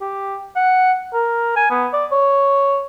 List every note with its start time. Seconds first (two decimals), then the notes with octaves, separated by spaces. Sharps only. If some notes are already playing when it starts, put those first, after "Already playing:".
0.01 G4
0.56 F#5
1.14 A#4
1.56 G#5
1.71 B3
1.93 D5
2.12 C#5